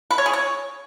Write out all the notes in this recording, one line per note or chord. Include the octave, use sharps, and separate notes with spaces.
B4
C#5
G#4
C#5